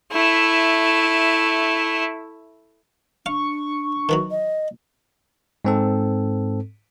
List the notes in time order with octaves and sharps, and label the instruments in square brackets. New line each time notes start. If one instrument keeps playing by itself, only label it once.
[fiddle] A3 E4
[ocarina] D4 [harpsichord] F5 [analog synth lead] C#6
[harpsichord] D#3 E3 F#3
[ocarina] D#5
[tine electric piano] G#2 C4 A4